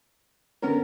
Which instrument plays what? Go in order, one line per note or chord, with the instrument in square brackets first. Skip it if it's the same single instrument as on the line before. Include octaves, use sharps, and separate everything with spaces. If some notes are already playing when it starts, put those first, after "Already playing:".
[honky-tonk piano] D3 B3 C#4 [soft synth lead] A#4